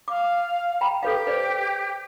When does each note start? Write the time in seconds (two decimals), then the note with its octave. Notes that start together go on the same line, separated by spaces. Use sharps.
0.08 F5 D6
0.81 G5 A#5 B5
1.03 G4 A4 B4 F5
1.27 B4 C5 D5